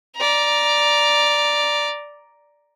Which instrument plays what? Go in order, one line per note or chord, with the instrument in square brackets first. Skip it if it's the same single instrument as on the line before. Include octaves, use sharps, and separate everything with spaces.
[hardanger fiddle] D5 A#5